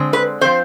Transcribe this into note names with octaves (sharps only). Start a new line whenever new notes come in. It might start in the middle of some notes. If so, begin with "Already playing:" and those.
Already playing: D3 G#3 C4
B4
F3 C4 C5